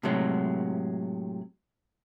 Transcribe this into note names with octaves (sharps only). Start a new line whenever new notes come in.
A2 C3 F#3 G#3